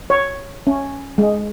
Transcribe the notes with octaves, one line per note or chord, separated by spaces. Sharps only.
C#5
C#4
G#3